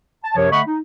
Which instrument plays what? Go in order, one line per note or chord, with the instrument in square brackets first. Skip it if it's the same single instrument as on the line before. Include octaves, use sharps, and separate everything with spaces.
[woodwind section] A5
F#2 C3 F3 A#4 C#5
D3 A3 D#5 F#5 B5 C#6
D#4